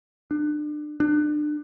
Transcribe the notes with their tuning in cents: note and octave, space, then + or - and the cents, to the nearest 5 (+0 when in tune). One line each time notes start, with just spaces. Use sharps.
D4 +30
D4 +30